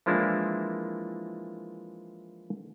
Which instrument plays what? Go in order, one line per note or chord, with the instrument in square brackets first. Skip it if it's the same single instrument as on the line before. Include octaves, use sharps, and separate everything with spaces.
[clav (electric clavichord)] E3 F3 G#3 A#3 D4 E4